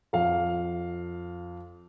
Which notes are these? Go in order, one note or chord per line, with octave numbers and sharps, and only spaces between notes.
F2 F5